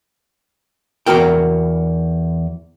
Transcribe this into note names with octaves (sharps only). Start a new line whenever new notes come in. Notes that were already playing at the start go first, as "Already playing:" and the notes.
E2 F3 F#4 A#4 G5